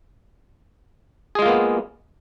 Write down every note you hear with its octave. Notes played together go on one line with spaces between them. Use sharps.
G#3 A#3 B3 F4 G#4